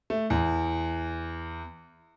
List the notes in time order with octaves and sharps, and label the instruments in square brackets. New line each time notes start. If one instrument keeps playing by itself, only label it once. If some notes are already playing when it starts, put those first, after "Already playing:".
[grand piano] A3
E2